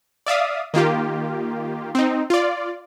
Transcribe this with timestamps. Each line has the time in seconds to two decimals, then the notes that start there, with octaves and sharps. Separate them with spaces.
0.26 D5 E5 F5 D#6
0.74 D#3 A#3 F4 G4
1.95 C4 D#4
2.30 F4 D5